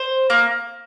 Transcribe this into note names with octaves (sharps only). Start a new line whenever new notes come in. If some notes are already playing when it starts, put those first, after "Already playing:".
Already playing: C5
A#3